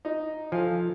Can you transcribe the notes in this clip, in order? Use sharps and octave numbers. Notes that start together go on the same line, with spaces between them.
D#4
F3 A4 F5 G#5